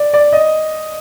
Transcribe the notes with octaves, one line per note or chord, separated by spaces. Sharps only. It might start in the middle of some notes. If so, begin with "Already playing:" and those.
Already playing: D5
D5
D#5